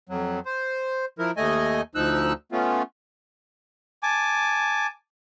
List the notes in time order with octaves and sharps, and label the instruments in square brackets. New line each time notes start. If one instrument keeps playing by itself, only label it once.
[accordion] F2 F#3
C5
F3 E4 A#4
D#2 A3 D#5 G#5
D2 F3 D#4 E6 F#6
A3 B3 C#4 F4
[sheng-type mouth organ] G#5 A5 D6